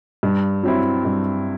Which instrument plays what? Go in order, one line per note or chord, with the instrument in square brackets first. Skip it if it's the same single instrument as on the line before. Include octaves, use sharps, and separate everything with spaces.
[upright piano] G2
F#3 C4 E4
G2